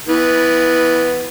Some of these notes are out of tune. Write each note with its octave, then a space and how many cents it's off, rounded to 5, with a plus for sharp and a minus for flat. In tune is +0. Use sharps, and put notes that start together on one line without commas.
E3 -15 B3 +0